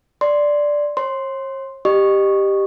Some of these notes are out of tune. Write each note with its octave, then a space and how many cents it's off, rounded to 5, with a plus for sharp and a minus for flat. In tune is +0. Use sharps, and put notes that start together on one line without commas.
D5 +0 C6 +0
C#5 -45 C6 +0
G4 +0 D#5 -30 C#6 -5